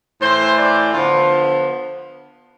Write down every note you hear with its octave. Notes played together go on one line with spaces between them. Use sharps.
A2 E3 A3 C5
D5
D3 F3 B3 F4